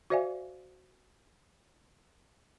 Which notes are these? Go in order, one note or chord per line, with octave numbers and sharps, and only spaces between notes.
F#4 C5 D5 E5 F5 G#5